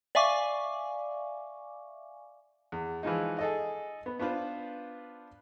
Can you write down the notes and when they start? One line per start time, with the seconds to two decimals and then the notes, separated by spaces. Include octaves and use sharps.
0.15 D5 E5 F5 G#5 C#6 D6
2.72 E2
3.03 E3 F3 G#3 D#4
3.39 G#4 A4 D#5
4.06 B3
4.20 B3 D4 F4 B4 C5